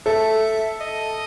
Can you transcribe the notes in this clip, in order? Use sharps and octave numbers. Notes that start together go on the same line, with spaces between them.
A4 E5
D#5